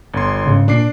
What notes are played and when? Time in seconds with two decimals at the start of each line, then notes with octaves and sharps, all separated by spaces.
0.14 G1 C6
0.46 G#2 C#3
0.68 A#2 D4 D6 C7